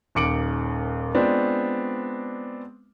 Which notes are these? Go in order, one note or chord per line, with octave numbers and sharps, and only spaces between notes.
D#1 D#2 D6 C#7 D7 F#7
G#3 B3 C4 D4 F4